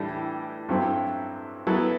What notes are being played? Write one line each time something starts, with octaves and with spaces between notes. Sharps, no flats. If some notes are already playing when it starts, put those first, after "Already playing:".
Already playing: A2 E3 G3 D4 A4
G2 F#3 C4 E4 A4
F#3 B3 E4 A4